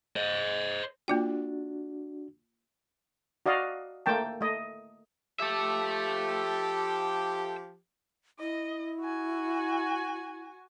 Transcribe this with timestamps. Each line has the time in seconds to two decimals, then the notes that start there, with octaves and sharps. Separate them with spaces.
0.16 C5 D#5
1.08 A#3 D4 F4 F#4 G5
3.46 F#4 D5 D#5 F5
4.06 A3 A#3 G5 A5
4.41 A3 D#5
5.40 F3 G4 A4 E5
8.40 E4 D#5
9.00 F#4 G#5